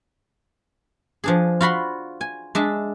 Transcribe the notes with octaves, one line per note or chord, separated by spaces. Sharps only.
F3 D4 G#4
F4 F#4 B5 C6
G#5
G#3 D4 E5 A5